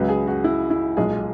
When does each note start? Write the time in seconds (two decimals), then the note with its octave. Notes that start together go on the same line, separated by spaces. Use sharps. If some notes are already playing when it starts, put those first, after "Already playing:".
Already playing: C#2 C#3 F#3 B4
0.09 G#4
0.27 F#4
0.44 E4
0.70 E4
0.97 B1 A#2 G#3 G#4